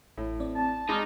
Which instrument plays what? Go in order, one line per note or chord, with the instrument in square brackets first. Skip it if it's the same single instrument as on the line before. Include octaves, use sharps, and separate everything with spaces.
[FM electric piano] A1 [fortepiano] A2
[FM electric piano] C4 D5
[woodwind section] A5
[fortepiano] G#3 D6 [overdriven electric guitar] D#4 [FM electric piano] B5 F6